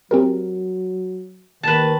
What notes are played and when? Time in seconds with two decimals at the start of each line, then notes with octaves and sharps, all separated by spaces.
0.11 F#3 C4 G4 A#4
1.63 D#2 D#3 B4 A5